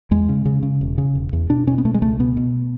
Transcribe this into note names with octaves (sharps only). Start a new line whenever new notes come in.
E2 G#3
C#3
C#3
C#3
E1
C#3
E1
E2
B2 D4
B2 C#4
B3
B2 A3
G#3
C#2 A3
B2 B3
B2